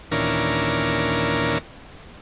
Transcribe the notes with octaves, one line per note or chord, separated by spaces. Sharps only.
D#2 A#2 E3 C#4 D4 A#4